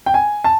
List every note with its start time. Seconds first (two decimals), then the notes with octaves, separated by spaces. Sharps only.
0.06 G5
0.14 G#5
0.44 A5